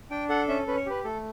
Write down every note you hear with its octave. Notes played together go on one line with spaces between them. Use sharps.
D4 G5
A4 F#5
C#4 E5
C#4 B4
C#5
G4 B4
A3 A4